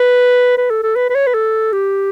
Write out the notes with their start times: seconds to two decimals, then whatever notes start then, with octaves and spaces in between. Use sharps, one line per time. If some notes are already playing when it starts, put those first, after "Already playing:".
Already playing: B4
0.58 B4
0.71 A4
0.83 A4
0.96 B4
1.10 B4
1.15 C#5
1.27 B4
1.34 A4
1.73 G4